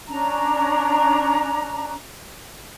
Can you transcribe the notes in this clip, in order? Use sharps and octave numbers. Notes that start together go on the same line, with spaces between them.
C#4 D4 A#5